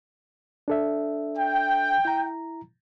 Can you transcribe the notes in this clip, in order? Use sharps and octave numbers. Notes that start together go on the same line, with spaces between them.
D4 A4 E5
G5
E4 A#5